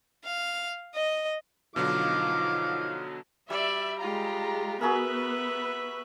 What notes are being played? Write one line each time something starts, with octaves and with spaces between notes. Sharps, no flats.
F5
D#5
B2 D3 F3 F#3 D#4 F4 F5 D6
G3 D5 E5
G#3 F4 G4 A#5
B3 F#4 G#4 A#4 B4 E5